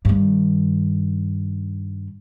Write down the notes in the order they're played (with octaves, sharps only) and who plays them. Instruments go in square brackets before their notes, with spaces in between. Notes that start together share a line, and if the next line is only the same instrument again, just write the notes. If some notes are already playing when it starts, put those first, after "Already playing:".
[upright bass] G2 D#3